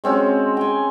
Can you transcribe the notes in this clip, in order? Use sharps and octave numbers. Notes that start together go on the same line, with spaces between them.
G#3 C4 C#4 F#4
G5 G#5